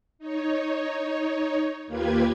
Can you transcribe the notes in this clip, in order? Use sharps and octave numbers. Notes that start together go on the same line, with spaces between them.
D#4 C#5
D#2 A#3 F4 G4 B4 G#6